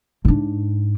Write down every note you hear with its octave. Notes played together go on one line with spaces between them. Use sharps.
G#2 D4